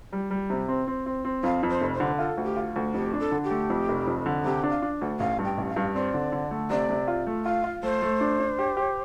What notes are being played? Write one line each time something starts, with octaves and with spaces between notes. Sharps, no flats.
G3
G3
C3
C4
C4
C4
C4
F2 F5
F2
C5
F1
C5
D3
F4 A4
D2
G4
F4
D2
F2 G4
D4
A4
D3
G4
A3
F2
F1
F2
D3
C3 G4
D4
F5
D4
D2
A1 F5
G2
G5
A1
F5
G2
C4 D5
D3
D3
A3
C3 D5
C3
F4
A3
F4 F5
F4
A3 C5
A3
D4
D4
G4
G4